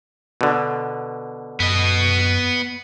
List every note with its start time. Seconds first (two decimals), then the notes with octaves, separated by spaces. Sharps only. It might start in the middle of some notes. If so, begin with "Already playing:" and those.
0.41 B2 D3
1.60 F#2 B3 D#5